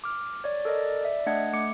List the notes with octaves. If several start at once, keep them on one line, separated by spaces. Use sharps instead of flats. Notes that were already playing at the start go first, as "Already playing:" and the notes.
D6 F6
C#5 D5
A4 A#4 D5 D#5
D5 E5
A3 D4 D#5 F#5 G#6
A3 D6 C#7